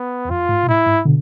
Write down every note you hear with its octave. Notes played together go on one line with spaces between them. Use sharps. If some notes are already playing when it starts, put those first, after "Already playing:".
Already playing: B3
E2
F2 F4
G#2
B2
A2 E4
G#2
B2 D3